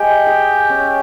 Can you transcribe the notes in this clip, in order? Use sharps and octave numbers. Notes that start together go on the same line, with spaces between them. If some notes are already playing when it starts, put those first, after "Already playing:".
Already playing: G#3 G4 G5
G#4
C#4